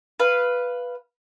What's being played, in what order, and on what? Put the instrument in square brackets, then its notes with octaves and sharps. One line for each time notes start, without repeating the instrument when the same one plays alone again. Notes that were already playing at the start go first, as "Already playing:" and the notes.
[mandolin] B4 F5